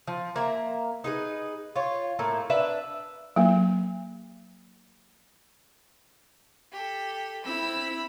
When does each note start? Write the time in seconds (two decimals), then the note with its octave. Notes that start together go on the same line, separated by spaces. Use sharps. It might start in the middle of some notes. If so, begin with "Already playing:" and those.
0.08 F3
0.36 A#3 E5 G#5 A#5
1.04 D#4 G#4 B4
1.76 F4 C#5
2.19 A2 A#3 A4 E5
2.50 D4 B4 E5
3.36 F#3 A#3
6.72 G4 A4
7.44 C4 E4 B5 E6